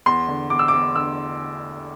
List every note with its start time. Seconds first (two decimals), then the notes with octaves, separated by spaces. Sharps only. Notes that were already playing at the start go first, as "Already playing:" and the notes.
0.06 E2 C6
0.28 D3
0.50 E2 D6
0.59 E6
0.68 D6
0.73 E2
0.96 D3 E6